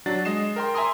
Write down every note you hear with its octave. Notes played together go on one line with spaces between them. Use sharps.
F#3 D4 F#4 A6
G#3 D#5 C7 E7
A#4 G5 C6
E5 G#5 A#5 C6 D#6